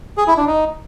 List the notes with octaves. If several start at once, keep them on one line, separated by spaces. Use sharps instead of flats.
G#4
E4
D4
D#4